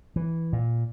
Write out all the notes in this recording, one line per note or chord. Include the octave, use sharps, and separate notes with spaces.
E3
A#2